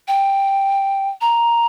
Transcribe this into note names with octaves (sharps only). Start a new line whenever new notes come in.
G5
A#5